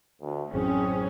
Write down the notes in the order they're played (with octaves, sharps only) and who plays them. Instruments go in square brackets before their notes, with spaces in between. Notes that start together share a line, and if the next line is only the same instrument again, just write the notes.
[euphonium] D2
[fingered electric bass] A1 F#2 E3 [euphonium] C4 [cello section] C#4 [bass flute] G#4